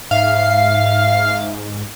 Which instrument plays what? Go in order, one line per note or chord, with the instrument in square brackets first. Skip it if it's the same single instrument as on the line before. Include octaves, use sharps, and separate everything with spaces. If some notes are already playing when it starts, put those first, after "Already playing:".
[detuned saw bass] G#2 [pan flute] E5 [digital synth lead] F5